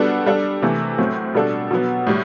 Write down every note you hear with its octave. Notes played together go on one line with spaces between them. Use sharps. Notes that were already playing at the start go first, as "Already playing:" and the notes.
Already playing: G3 B3 D4 F#4 A4
G3 D4 A4
C3 E3 A3
A2 F#3 A3 C4
B2 G3 D4 A4
B2 F#3 B3
A2 G3